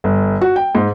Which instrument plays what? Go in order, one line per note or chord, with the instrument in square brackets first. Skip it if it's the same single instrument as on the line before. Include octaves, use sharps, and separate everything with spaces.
[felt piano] G1
F#4
G5
G#2